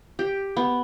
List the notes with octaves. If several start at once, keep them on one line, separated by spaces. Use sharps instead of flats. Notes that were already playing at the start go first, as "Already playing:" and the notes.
G4
B3